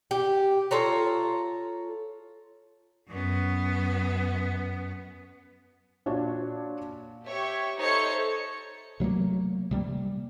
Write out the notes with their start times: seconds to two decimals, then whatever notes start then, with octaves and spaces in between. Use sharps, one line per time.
0.11 G4
0.71 F4 A4 C#5 A#5
3.08 F#2 B3
6.06 A#2 D4 F#4 C#5
7.27 G4 C#5 E5
7.81 D#4 A4 C5 C#5 E5 C#7
9.00 C3 F#3 A3 A#3
9.71 C3 G3 A3 A#3